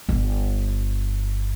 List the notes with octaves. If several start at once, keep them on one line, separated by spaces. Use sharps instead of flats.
G1